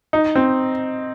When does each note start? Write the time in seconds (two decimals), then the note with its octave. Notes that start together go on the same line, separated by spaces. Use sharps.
0.13 D#4
0.35 C4